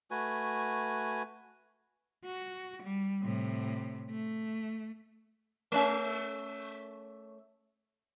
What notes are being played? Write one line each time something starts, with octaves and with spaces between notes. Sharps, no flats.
A3 F#4 B4 G#5
F#4
G3
A2 C3
A3
A3 C#4 E5